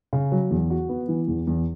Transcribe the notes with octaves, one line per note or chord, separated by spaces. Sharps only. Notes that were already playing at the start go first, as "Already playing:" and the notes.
C#3
F#3
E2
F#4
B3
E3
E2
E2